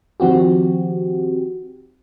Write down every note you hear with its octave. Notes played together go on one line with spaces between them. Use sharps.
D#3 F3 C4 F#4 G4